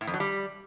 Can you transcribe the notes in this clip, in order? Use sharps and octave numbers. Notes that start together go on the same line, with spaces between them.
A2
F2
F#3
G3